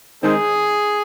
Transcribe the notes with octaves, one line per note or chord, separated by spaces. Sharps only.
D#3 G#3 C4 D#4 G#4